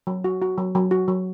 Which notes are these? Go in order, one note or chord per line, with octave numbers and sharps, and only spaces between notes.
F#3
F#4
F#4
F#3
F#3
F#4
F#3